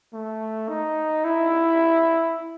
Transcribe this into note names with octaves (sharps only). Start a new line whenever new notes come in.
A3
D#4
E4